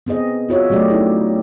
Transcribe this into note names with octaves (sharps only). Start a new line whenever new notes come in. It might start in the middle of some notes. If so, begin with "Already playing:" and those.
B3 C4 G#4 D#5
F4 F#4 C#5 E5
F#3 A3 C#4 G4 D5 D#5
C#4 D#4 E4 G4